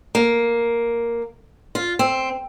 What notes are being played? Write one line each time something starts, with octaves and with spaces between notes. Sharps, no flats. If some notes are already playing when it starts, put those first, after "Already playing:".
A#3
F4
C4